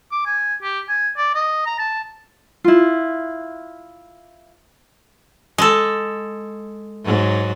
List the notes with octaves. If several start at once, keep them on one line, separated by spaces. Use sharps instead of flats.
D6
G#5
G4
G#5
D5
D#5
A#5
A5
E4 F4
G#3 A4
G#2 F#3